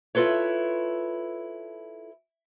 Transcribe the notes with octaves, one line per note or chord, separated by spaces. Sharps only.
E4 F4 A4 B4 C#5